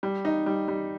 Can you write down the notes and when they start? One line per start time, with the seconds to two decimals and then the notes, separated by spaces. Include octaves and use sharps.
0.03 G3
0.25 D#4
0.46 G3
0.68 G3